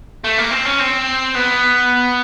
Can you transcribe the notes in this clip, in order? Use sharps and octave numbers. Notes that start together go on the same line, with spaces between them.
A3
A#3
C4
C#4
C4
B3